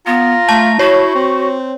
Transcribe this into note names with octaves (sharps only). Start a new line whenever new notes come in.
B3 F4 A#5
A3 A5
E4 F#4 C#5 C#6
C4